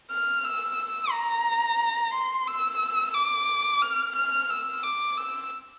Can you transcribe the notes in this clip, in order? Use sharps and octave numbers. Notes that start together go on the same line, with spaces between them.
F6
E6
A#5
C6
E6
D6
F6
F6
E6
D6
E6